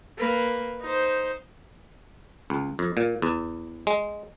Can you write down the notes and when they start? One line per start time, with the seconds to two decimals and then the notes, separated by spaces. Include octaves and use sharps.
0.18 A#3 B4
0.82 D#4 C5
2.50 C#2
2.79 F2
2.97 A#2
3.22 E2
3.87 G#3